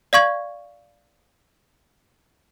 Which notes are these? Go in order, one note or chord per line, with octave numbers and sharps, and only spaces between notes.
D5 F5 C#6 G#6